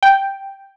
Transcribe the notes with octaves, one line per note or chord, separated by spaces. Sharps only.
G5